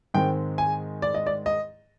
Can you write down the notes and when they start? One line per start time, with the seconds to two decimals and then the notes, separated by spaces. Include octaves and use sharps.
0.14 G#2 D#3 G#3 C4 G5
0.58 G#5
1.02 D5
1.14 D#5
1.26 D5
1.46 D#5